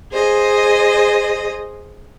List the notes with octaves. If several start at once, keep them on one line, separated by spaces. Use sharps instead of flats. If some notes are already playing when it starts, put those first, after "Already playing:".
G#4 C5 D#5